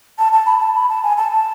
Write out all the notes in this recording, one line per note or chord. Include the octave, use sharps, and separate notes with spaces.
A5
A5
B5
A5
B5
A5
G#5
A5
A5